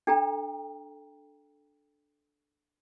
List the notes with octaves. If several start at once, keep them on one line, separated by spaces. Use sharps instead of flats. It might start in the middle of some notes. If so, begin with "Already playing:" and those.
D4 A4 G5 A#5